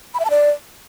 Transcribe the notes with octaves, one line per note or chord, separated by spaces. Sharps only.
B5
E5
A5
D5